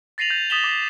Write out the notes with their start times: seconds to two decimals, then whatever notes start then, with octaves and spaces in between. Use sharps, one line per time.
0.18 A6 A#6 C7 D#7 F7 F#7
0.30 G6
0.50 D#6 A6 B6 E7 F#7 G7
0.64 D6 A#6